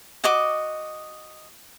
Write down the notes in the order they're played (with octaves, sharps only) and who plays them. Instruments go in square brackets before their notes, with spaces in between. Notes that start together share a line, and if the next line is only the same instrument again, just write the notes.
[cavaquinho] F#4 D#5 D6